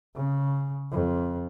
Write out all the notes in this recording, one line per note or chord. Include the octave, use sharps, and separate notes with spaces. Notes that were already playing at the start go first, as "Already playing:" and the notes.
C#3
F2